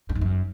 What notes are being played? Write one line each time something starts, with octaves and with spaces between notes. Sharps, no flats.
G2
G#2
F#2